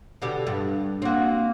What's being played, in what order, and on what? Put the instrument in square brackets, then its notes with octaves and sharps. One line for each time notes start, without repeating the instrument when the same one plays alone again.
[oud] B2 D3 G4
G2
[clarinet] A#3 [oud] C4 F#4